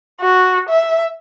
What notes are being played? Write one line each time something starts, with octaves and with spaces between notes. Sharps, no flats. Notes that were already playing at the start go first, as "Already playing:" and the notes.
F#4
E5